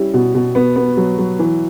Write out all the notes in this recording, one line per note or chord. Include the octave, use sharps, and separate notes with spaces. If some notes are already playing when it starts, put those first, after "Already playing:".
Already playing: G3 C#4 E4
B2
B2
B3
B3
F#3
F#3
E3